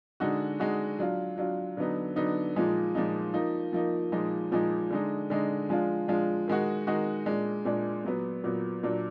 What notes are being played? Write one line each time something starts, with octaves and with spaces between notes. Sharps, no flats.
D3 G#3 D#4 F#4
D3 G#3 D#4 F#4
F#3 D4 F4
F#3 D4 F4
D3 F#3 B3 D#4
D3 F#3 B3 D#4
A#2 F3 G#3 D#4
A#2 F3 G#3 D#4
F3 A#3 D#4
F3 A#3 D#4
A#2 F3 G#3 D#4
A#2 F3 G#3 D#4
D3 G#3 D#4
D3 G#3 D#4
F3 G#3 D4 F4
F3 G#3 D4 F4
D#3 G#3 D#4 F#4
D#3 G#3 D#4 F#4
A#2 G#3 D4
A#2 G#3 D4
A#2 F#3 B3
A#2 F#3 B3
A#2 F#3 D4